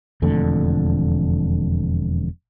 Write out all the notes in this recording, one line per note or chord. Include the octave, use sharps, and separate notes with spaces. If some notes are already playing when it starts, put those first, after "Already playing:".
E1 F2 D3 A3